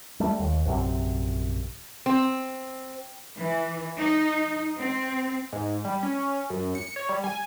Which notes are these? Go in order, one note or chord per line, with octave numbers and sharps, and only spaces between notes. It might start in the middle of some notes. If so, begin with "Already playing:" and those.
G3 A3
D#2
A#1 F#2 C3
C4
E3
D#4
C4
G#2
G3
C#4
F#2
C#7
C#5
G3
G#5